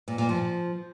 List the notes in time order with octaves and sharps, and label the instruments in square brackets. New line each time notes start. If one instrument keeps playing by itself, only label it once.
[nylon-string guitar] A#2
A#2
F3